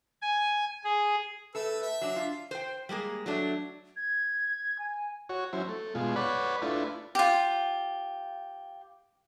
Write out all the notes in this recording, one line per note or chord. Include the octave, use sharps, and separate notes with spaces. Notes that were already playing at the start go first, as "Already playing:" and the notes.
G#5
G#4
A3 A4 B4 E6
E5
F#3 D4
F4
C5 G5
G3 G#3 A#3 G#4
F#3 A3 D4
G#6
G#5
F#4 C#5
F#3 C#4 E4 C5
A3
B2 G#3 F4
B4 C#5 D5 F#5 B5
A3 D4 E4 F4 B4
F4 G4